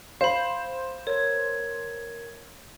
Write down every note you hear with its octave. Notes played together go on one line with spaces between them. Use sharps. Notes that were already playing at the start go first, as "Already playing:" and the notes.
C5 F5 B5
A#4 C#5 G#6